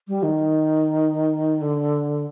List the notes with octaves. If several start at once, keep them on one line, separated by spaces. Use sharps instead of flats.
G3
D#3
D3